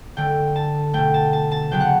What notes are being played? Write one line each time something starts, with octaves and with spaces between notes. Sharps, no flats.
D3 A3 G5
A5
B2 A3 G5
A5
A5
A5
C#3 F#3 B3 G5
F#5